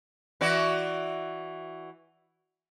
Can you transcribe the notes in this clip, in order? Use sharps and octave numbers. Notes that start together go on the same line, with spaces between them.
E3 F#4 D5